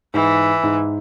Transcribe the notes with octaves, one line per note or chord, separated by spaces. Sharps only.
G#2 E3
G#2